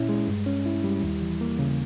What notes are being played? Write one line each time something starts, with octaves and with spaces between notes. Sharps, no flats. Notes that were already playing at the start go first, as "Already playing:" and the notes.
Already playing: A#2 C#4 E4
G#3
G2
C#4
E4
G3
D#2
E3
A#3
C#3